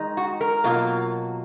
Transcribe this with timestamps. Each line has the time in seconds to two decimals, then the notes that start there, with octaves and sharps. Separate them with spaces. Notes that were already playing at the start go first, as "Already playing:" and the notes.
Already playing: D#3 G#3 D#4
0.17 F#4
0.41 A#4
0.64 B2 F#3 A#3 F4